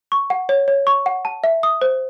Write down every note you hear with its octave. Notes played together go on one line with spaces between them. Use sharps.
C#6
F#5
C#5
C#5
C#6
F#5
A5
E5
D#6
C5